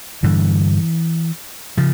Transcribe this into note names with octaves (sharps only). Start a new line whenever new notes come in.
G2 D3 E3
C#3 F3